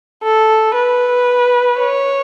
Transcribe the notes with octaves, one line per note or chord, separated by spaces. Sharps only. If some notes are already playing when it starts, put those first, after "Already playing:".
A4
B4
C#5